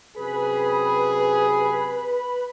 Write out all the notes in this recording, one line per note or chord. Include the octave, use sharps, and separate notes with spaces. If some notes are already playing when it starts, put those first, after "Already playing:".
F#2 C3 G#4 B4 B5